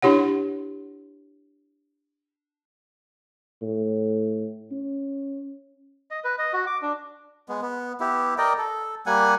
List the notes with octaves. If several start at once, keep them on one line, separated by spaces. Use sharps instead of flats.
D4 E4 G4 C#5 F#5
A2
C#4
D#5
B4
D#5
F#4
D6
D4
G#3 B3
B3
B3 E4 G4
A#4 D5 D#5 G5
A4
G3 A#3 F#5 G#5